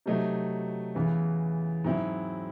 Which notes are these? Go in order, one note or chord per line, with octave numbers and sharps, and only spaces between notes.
C3 F#3 A3 D#4
E2 C#3 E3
G#2 F#3 C4 E4